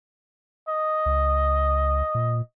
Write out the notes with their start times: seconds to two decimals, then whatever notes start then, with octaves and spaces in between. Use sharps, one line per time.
0.69 D#5
1.06 C#2
2.15 A#2